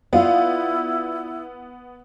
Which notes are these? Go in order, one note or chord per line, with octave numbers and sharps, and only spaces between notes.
B3 E4 F4 D5 F5